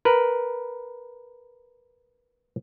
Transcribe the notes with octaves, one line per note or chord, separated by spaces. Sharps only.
A#4 B4